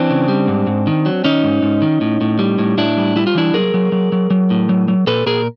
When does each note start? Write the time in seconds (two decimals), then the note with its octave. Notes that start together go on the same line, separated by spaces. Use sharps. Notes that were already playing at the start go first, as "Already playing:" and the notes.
Already playing: E3 C4 D4
0.10 C#3
0.28 G3
0.48 G#2
0.67 G#2
0.87 D#3
1.06 F#3
1.24 D#3 C#4 D#4
1.44 G#2
1.62 G#2
1.82 D#3
2.01 A2
2.21 A2
2.39 G3
2.59 A2
2.77 A2 D4 E4
2.97 G3
3.16 G3 E4
3.27 F4
3.35 E3 D4 E4
3.54 F#3 G#4 A#4
3.74 F#3
3.92 F#3
4.12 F#3
4.30 F#3
4.50 A2
4.69 F#3
4.88 F#3
5.07 A#2 A4 B4
5.26 A#2 G#4 A#4